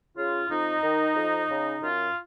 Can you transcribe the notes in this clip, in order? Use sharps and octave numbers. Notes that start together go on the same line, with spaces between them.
C#3 F4
F2 D#4
D#3
F2
C#3
F#2 F4